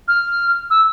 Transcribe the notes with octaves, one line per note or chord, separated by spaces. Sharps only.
F6
E6